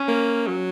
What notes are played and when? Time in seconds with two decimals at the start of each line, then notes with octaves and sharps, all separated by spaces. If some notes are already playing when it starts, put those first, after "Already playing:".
Already playing: C#4
0.08 A#3
0.47 F#3